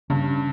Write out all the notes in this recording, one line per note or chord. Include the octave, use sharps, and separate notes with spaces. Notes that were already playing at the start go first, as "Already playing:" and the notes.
G2 C#3 C#4